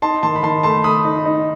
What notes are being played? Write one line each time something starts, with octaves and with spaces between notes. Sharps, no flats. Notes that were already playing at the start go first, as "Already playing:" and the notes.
D#4 A5 C6
D#3 A5 C6
B5
D#3 A5 C6
A3 A5 C6
A3 B5 D#6
D#4
D#4